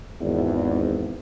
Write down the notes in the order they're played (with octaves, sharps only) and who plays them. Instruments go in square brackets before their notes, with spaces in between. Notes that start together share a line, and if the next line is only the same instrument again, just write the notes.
[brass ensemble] G#1 E2